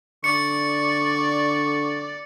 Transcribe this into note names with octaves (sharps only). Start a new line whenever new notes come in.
D3 D5 C#6 C#7